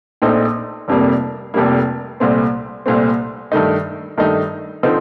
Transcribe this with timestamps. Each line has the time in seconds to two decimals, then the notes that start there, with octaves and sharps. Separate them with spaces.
0.22 A#1 A#2 A3 C4 D#4
0.88 F1 F2 C3 G3 A#3
1.54 F1 F2 C3 G3 A#3
2.20 C2 A#2 A3 C4
2.86 C2 A#2 A3 C4
3.52 G2 D#3 A3 D#4
4.18 G2 D#3 A3 D#4
4.83 D3 F3 C4 D#4